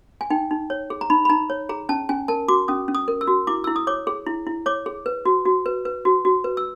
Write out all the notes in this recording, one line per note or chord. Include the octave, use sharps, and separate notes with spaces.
G#5
D#4 G5
D#4
C#5
G#4
A#5
D#4 B5
B5
D#4 A#5
C#5
G#4 A#5
C#4 A5
C#4 G#5
A#4 A5
F#4 D6
C#4 D#6
C#4
D#6
A#4
E6
F#4
E4 D6
E4 E6
D#6
C#5 D6
G#4
E4
E4
C#5 D6
G#4
B4
F#4
F#4
B4
B4
F#4
F#4
B4
E6